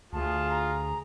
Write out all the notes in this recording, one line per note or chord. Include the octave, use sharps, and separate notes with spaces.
D2 F4 G#4 A5
A#5